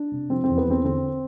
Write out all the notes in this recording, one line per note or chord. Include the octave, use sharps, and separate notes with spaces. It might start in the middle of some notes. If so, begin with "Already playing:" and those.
Already playing: D4
C3
F3 C4
C4
E2
B3
E2 C4
D3 C4